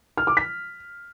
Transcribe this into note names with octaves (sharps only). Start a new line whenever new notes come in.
F6
D6
B6